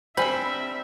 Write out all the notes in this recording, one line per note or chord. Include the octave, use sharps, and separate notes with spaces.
G3 C4 D4 C5 E5 G#5 B5